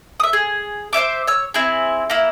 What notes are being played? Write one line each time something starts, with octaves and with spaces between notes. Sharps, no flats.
E5 D#6
G#4
C5 C#5 E5 D6
C#5 E6
C4 E4 G#4
A#3 E4